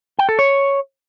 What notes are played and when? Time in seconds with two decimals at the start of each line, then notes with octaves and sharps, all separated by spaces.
0.19 G5
0.29 A4
0.39 C#5